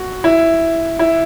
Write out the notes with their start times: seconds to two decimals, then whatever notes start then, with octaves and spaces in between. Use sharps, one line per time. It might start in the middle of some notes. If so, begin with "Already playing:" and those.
Already playing: F#4
0.24 E4
0.99 E4